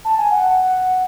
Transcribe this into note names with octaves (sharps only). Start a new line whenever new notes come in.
A5
G#5
F#5